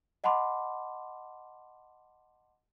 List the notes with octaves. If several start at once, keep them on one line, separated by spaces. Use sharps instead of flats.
D#5 F#5 A5 B5 C6 D6